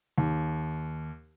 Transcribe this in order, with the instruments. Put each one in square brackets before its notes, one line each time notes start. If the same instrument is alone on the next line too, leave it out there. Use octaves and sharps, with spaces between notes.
[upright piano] D#2